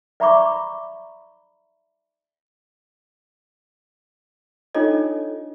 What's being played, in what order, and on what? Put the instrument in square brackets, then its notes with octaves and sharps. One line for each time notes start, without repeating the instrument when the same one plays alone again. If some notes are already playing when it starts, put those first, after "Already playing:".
[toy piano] D5 E5 A#5 B5 C#6 D6
[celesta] D4 D#4 F4 A4 C#5 D#5